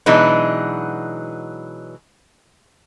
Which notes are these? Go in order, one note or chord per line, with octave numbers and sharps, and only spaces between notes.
B2 E3 F#3 G#3 D4 D#4